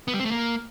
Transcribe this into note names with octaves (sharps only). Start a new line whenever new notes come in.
B3
G3
C4
A3
A#3